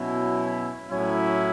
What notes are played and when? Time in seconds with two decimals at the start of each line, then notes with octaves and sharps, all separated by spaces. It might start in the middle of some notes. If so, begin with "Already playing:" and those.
Already playing: B2 F#3 C#4 E4
0.90 A2 F#3 C#4 E4